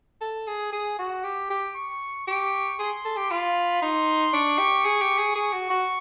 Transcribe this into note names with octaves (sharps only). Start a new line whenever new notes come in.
A4
G#4
G#4
F#4
G4
G4
C#6
G4 C#6
G#4 C6
A4
G4
F4 B5
D#4 C6
D4 C#6
G4
G#4
G4
G#4
G#4 C#6
F#4
F#4